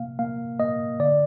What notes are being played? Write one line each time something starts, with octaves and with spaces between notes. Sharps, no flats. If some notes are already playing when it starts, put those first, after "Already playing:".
Already playing: C3 A#3 F5
A#3 F5
A#3 D#5
D3 D5